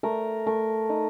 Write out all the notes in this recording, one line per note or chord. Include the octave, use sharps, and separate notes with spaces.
A3 A#4
A3 A#4
D#4